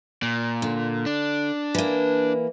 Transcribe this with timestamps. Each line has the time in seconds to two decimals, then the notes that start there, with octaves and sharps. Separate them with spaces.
0.22 A#2
0.62 D3
1.06 D4
1.75 E3 A#3